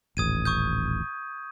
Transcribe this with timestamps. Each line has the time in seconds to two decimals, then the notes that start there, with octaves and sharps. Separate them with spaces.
0.17 D#1 A1 D#6 G#6 D#7
0.45 C#6 D#6 G6